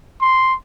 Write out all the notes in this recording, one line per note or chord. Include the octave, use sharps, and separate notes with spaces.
C6